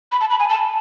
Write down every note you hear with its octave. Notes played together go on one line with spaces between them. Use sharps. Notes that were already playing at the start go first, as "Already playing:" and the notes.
B5
A5
B5
G#5
A5